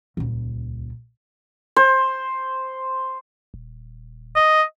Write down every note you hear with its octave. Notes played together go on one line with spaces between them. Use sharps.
D#1 C#2
C5
D#1
D#5